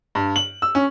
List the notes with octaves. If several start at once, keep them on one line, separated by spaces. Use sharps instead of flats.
G2
F#7
E6
C#4